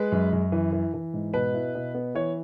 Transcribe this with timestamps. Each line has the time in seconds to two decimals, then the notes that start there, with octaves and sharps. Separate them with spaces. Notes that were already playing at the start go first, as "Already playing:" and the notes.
Already playing: G#3 B4
0.12 F#2
0.33 F#2
0.52 E3
0.73 E3
0.94 E3
1.14 G#2
1.34 B2 B4
1.54 E4
1.75 B2
1.95 B3
2.15 E3 C#5